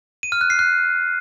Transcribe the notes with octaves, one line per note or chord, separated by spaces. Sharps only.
D#7
F6
F#6
C7
F#6